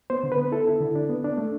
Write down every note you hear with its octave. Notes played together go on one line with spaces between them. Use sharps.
B3 C5
D3
B4
B3
E4 A4
E4
D3
D4
B3
D4
A3